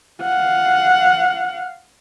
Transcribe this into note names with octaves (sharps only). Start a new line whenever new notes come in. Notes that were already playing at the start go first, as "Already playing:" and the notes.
F5 F#5